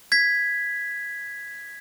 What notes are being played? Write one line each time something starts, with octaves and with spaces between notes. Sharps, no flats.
G#6 B6